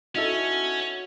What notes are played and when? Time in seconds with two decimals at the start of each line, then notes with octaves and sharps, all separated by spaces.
0.15 C#4 D#4 E4 F#4 A4